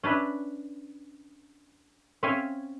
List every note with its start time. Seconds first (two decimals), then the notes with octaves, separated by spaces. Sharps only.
0.03 C#4 D4 B4 E5
2.23 C4 C#4 C#5 E5 F5 G#5